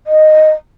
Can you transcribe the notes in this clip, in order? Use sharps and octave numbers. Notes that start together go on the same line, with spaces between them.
D#5